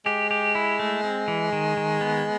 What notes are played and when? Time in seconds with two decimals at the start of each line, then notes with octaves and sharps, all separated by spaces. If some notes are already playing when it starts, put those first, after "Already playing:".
0.06 G#3 G4
0.31 G4
0.55 E4
0.79 A3
1.04 C4
1.28 E3
1.53 D#3
1.77 D#3
2.01 B3